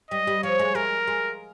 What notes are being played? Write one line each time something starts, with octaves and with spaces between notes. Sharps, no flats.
G3 D#5
G3
F3 C#5
G#3
G#3 A#4
G#3